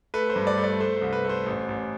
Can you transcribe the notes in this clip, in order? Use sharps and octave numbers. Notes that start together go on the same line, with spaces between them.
A3 B4
C5
G2
D5
A3
D5
A3 C5
C2 C5
B4
A3 C5
A1
A1